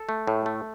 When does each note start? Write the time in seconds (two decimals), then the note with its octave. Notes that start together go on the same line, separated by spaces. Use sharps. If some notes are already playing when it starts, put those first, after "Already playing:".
Already playing: A4
0.09 A3
0.27 A2
0.46 A3